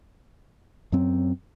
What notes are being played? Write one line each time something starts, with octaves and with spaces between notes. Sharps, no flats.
F#2 F#3 C4